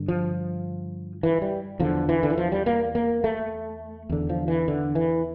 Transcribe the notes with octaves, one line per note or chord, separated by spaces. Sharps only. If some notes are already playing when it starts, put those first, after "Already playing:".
Already playing: G2 D3
F3
E3
G3
E2 D3 F3
E3
D3
E3
F3
G3
A#3
A#3
A3
E2 D3
F3
E3
D3
E3